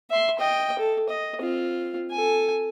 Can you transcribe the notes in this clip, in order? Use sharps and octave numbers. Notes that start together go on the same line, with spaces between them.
E5 C6
D#5 G5
A4
D#5
C4 F4
A4 G#5